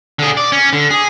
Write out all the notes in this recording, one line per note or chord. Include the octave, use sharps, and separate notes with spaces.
D3 G#4
D5
C#4
D3
G#4